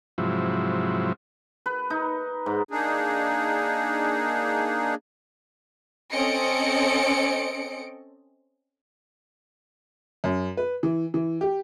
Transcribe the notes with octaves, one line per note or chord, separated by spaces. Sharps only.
G#2 C3 F3 F#3 E4
B4
D#4
G#2
A#3 D4 D#4 G#4
C4 C#4 A4 D#5 C#7 D7
F#2
B4
E3
E3
G4